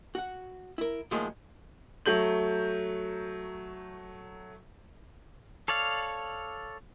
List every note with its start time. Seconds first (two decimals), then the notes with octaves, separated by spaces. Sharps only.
0.15 F#4 F#5
0.78 E4 A#4
1.11 A2 D#3 F3 F#3 G#3 A#3
2.06 F#3 A3 G6 F#7
5.68 A4 C#5 D5 F5